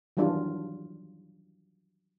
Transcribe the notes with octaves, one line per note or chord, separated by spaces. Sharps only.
D#3 E3 F#3 G3 D4 F4